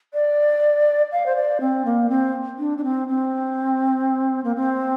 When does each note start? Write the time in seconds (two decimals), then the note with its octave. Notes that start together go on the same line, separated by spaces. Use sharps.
0.13 D5
1.11 F5
1.26 C5
1.36 D5
1.60 C4
1.85 A#3
2.09 C4
2.58 D4
2.77 D4
2.84 C4
3.07 C4
4.44 A#3
4.55 C4